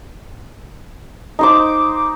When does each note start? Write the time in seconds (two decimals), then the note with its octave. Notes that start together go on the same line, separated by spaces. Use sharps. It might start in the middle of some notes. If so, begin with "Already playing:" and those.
1.39 D#4 C5 D6